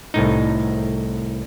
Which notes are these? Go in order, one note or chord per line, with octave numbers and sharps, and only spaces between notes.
C2 A2 D#4